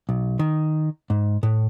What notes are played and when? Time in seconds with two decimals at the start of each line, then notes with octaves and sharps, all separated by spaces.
0.09 B1
0.39 D#3
1.10 G#2
1.43 A2